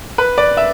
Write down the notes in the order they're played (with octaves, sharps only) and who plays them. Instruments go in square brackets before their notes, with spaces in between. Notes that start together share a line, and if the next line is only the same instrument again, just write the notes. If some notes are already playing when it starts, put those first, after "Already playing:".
[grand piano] B4
D5
E5